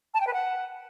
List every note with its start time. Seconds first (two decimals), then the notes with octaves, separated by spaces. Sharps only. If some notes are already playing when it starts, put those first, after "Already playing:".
0.14 A5
0.20 G5
0.27 B4
0.33 F#5